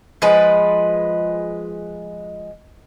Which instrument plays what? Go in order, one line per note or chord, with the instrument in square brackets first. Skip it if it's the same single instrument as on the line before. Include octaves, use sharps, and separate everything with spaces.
[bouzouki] F3 G#3 B4